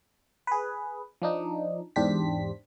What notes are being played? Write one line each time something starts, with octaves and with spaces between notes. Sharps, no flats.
G#4 B4
F3 D4 D#4
E2 G#2 D4 G4 C5 B6